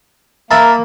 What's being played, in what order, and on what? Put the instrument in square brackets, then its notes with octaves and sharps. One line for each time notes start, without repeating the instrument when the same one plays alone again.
[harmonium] A#3 [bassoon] A#4 [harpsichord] E5 A5 B5